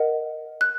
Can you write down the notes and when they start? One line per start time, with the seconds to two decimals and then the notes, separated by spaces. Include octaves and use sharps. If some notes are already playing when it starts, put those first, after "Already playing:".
Already playing: A#4 D#5 F#5
0.61 F#6